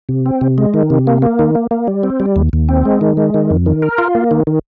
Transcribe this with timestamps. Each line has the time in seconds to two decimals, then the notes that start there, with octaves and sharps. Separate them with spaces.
0.09 C3
0.26 C4
0.41 C3
0.58 G#3
0.74 D#3
0.90 C3
1.07 A#3
1.22 A#3
1.39 D#3
1.55 A#3
1.71 A#3
1.87 G3
2.03 C4
2.20 G3
2.36 D#2
2.53 D#2
2.69 C4
2.85 G#3
3.01 D#3
3.17 G#3
3.34 D#3
3.50 F2
3.66 D#3
3.82 A#4
3.98 F4
4.15 A#3
4.31 D#3
4.47 D#3